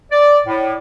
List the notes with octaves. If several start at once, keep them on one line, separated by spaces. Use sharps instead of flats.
D5
A2